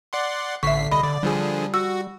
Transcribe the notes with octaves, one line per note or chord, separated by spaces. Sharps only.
D5 F#5 C6
A1 D3 E5 C#6 B6 C7
C2 D#5 B5
D3 D5
D3 F3 G3 G#4
F#4 E6